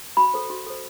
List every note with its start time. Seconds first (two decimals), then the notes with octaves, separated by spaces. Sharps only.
0.17 F#4 B5
0.34 A4 C5
0.50 F#4
0.67 A4 C5